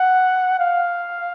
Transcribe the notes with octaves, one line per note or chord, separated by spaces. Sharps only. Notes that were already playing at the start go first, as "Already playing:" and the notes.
Already playing: F#5
F5